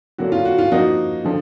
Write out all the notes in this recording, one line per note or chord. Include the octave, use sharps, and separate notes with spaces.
D3 F#3 A#3 D4 F#4
F4
F#4
F4
F3 A#3 D#4 F#4
D3 F3